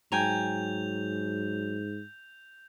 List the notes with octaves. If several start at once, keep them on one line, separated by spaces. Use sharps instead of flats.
G#2 F#3 G5 G#5 A#5 G6 F7